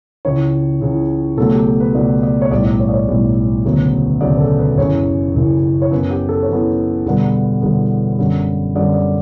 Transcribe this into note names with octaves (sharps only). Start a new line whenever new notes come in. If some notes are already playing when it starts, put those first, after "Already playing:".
C#2 C#3 E3 C#5
C#2 C#3 E3
C#2 B2 F#3 A3 A4
G4
A4
B4
C#2 B2 F#3 A3 D5
D5
C#5
B1 A2 G3 D5
D5
C#5
D5
C#5
B1 A2 G3
E1 D2 C#3 F#3 B3
E1 D2 C#3 F#3 B3 D5
B4
A4
B4
F#1 F#2 C#3 E3 C#5
F#1 F#2 C#3 E3
C#5
F#2 E3 B3 B4
G4
A4
C#5
F#2 E3 B3 B4
E1 E2 D3 G3 B3
E1 E2 D3 G3 B3
F#2 D3 G3
F#2 D3 G3 D5
D5